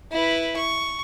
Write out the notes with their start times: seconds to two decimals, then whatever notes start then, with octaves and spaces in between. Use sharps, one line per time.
0.11 E4 B4
0.57 C#6